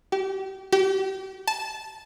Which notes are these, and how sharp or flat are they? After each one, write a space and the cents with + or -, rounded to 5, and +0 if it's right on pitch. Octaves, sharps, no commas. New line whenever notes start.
G4 -30
G4 -30
A5 -15